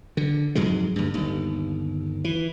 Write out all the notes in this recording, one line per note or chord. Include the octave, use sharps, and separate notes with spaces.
D3
F2 G#2 F#3 G#3
D2 G2
G1 D#2
E3